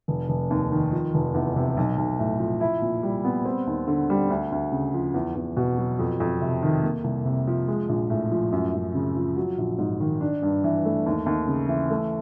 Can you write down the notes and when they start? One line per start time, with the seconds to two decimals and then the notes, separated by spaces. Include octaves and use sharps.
0.08 F1
0.29 F1
0.50 D#2
0.72 D#3
0.92 F3
1.14 F1
1.34 E2
1.56 C3
1.77 B1
1.98 B1
2.19 A2
2.40 F3
2.61 E4
2.82 A#2
3.03 G3
3.25 B3
3.45 C4
3.67 D#2
3.87 D3
4.10 G3
4.30 D2
4.52 D2
4.72 C#3
4.94 F3
5.14 E2
5.35 E2
5.57 B2
5.78 F#3
5.99 F2
6.20 F2
6.42 C3
6.63 D#3
6.83 A#3
7.04 C2
7.25 C3
7.48 F3
7.68 G#3
7.89 A#1
8.10 A2
8.32 F3
8.52 F#2
8.74 F#2
8.94 C#3
9.16 F3
9.36 F#3
9.58 A#1
9.78 G#2
10.00 D#3
10.21 D4
10.42 G2
10.64 E3
10.85 A3
11.06 D#2
11.26 D#2
11.47 C#3
11.68 E3
11.90 A3